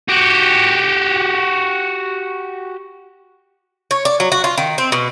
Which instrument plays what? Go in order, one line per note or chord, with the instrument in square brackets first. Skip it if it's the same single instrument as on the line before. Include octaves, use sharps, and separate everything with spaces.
[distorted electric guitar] F#4 G4
[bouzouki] C#5
D5
F#3
F#4
F4
D#3
C4
B2